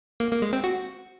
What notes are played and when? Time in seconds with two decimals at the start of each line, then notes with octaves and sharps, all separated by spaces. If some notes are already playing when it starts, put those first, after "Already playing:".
0.20 A#3
0.31 A#3
0.42 G#3
0.53 C4
0.64 F#4